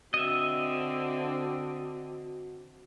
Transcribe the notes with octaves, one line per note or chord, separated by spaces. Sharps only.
D3 C4 F#4 D#5 E5